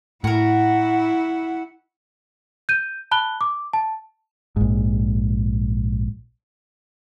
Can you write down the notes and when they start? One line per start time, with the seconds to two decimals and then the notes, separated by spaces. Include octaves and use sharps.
0.24 A2 E4 F#4 A#4 F#5
2.69 G6 D#7
3.11 A5 B5 F#6 G7
3.41 D6
3.73 A5
4.56 A#1 G#2